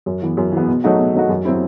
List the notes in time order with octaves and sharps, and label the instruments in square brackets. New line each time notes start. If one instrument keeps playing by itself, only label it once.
[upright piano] F#2
E3 B3
F#2
E3
B3
B2
F#3 A3 D#4 F#4
B2
F#3 A3 D#4 F#4
F#2
F#3 C4 E4